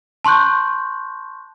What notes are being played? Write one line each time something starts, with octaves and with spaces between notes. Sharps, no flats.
A5 C6 C#6 F#6 G6